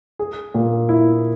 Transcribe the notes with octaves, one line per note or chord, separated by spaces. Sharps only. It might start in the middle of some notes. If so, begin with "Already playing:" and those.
G#4
A#2
E4